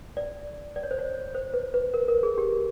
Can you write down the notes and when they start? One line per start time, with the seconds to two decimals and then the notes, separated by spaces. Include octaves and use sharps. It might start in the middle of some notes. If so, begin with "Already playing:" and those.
0.17 D5
0.76 D5
0.83 C#5
0.91 C5
0.99 C#5
1.35 C5
1.54 B4
1.74 B4
1.94 A#4
2.08 A#4
2.23 G#4
2.38 G4